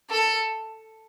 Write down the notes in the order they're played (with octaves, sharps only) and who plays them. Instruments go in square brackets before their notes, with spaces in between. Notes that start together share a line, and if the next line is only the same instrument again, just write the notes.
[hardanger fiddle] A4